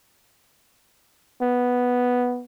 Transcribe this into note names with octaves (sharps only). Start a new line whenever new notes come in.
B3